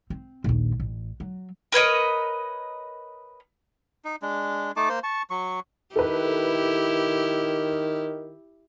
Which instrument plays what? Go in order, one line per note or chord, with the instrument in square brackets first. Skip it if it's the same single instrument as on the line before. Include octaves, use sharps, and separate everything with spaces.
[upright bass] C4
A#1 D#2
A1
F#3
[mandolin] A#4 B4 C#5 D#5
[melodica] D#4
G#3 D4
A3 D#4 A5 D6
A#3 C5
A5 C#6
F#3 C#6
[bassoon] D#3 [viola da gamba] E4 G4 [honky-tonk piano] A4 B4